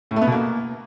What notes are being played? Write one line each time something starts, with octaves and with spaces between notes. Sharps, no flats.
A2
A3
B3
B2
A#3